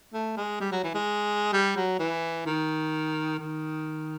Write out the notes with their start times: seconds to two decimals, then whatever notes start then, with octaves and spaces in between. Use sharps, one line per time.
0.13 A3
0.37 G#3
0.60 G3
0.72 F#3
0.83 E3
0.95 G#3
1.53 G3
1.76 F#3
2.00 E3
2.46 D#3
3.39 D#3